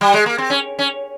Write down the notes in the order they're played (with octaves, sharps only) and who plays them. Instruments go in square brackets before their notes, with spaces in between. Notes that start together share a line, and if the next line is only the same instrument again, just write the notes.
[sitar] G3
G#3
A#3
C4
C#4
C#4